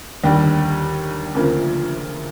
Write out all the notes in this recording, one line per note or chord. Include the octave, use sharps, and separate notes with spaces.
D#2 D3 G3
D2 C#3 F3 A#3